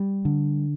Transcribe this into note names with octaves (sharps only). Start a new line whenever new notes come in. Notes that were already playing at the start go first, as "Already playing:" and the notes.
Already playing: G3
D3